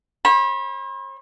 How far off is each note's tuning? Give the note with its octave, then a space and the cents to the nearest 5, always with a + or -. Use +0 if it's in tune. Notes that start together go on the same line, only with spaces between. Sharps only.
C5 +45 B5 -20